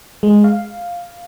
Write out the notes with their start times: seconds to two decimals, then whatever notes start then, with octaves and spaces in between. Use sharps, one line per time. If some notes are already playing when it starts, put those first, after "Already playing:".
0.23 G#3
0.44 F5